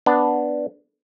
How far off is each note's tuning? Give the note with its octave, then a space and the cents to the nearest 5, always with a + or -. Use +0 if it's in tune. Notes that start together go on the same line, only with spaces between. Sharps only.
B3 +0 D4 +0